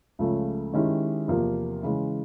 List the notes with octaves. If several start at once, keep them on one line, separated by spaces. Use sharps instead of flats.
C#2 C#3 F3 A3
D#3 G#3 C#4 E4 G4
E2 C3 F3 A#3
C#3 E3 G#3